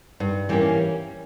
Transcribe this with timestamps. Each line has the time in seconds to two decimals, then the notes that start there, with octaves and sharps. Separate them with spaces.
0.20 G2
0.49 E3 G3 A#3 C#4